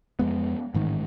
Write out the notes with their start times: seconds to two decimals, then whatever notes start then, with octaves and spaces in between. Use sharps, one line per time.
0.19 F2 G#3 B3
0.75 A1 G#2 D#3